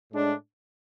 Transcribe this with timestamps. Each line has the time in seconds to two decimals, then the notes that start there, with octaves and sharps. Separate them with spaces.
0.11 A2 G#3 D4